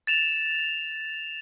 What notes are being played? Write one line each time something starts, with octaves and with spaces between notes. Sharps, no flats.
A6 E7 F7